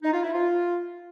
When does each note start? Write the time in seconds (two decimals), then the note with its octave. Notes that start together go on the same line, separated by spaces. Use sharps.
0.03 D#4
0.13 F4
0.23 E4
0.33 F4